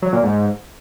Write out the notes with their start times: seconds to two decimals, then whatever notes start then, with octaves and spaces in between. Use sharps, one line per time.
0.02 F#3
0.13 A#2
0.23 G#2